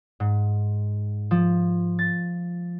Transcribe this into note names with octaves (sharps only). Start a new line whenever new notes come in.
G#2
F3
A6